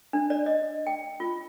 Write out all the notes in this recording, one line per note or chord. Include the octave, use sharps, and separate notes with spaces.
D4
D5
D#5
G5
F4